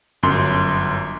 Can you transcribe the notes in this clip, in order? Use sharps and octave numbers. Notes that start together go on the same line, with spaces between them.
G1 F#2 C6